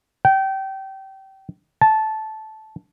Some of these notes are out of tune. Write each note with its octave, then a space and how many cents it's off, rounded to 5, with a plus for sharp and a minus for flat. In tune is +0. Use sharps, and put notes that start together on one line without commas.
G5 -25
A5 -10